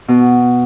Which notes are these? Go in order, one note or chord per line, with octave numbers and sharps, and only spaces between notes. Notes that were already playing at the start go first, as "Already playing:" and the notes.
B2